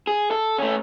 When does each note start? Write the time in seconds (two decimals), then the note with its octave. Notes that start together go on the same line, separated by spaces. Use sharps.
0.07 G#4
0.31 A4
0.58 A3 C#4